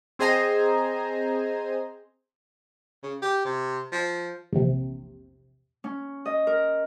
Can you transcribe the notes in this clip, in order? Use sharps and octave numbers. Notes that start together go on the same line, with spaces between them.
C4 G#4 C5 D#5 G#5 A#5
C#3
G4
C3
F3
A#1 E2 C3
C#4
D#5
A#4